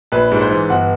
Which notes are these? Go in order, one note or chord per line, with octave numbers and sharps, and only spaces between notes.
A#1 B4
G#2
C5
E3
G1 F#5